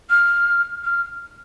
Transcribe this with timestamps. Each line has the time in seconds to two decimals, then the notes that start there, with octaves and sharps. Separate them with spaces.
0.10 F6
0.84 F6